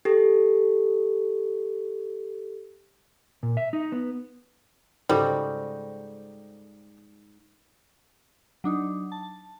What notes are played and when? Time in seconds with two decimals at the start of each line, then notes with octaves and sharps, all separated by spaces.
0.05 G4 A4
3.43 A#2
3.57 E5
3.73 D#4
3.92 B3
5.09 G#2 C#3 G3 D#4 F#4 G4 A4 C5
8.64 F#3 D4 D#4
9.12 A5